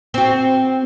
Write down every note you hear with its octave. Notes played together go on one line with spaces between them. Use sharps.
C4 F#4